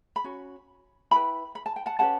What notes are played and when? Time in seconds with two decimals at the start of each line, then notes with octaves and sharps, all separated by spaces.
0.16 B5
0.24 C#4 F#4
1.11 E4 G4 G5 B5
1.16 B4
1.55 B5
1.66 A5
1.76 G5
1.86 F#5 A5
1.99 C#4 G4 B4 F#5 A5